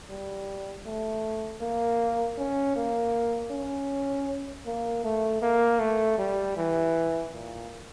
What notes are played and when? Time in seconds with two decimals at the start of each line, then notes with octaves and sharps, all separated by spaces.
0.10 G3
0.86 A3
1.61 A#3
2.38 C#4
2.76 A#3
3.51 C#4
4.66 A#3
5.04 A3
5.42 A#3
5.80 A3
6.18 G3
6.56 E3
7.33 A#2